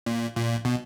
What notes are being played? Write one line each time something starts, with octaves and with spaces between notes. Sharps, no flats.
A#2
A#2
B2